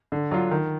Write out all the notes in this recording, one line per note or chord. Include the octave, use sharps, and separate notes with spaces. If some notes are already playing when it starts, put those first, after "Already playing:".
D3
F#3 D4 F4
D#3